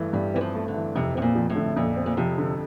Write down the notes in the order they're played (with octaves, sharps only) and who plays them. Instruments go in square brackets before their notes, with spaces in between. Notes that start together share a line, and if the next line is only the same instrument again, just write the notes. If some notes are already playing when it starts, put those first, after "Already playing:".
Already playing: [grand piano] G2 E3 A3
[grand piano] G2 [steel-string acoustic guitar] G3
[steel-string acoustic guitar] E3 [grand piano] C4
[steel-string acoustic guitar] F3
[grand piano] A3
[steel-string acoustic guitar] D3
[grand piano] E3
[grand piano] F2 [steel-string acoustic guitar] C3
[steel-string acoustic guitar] C3 [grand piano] C4
[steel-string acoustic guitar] A#2
[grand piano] F3
[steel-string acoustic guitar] A2
[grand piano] D3
[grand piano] F2 [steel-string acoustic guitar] A#2
[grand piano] C4
[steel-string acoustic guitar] A#2
[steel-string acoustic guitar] C3 [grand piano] F3
[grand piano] D3